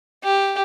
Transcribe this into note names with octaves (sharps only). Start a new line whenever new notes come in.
G4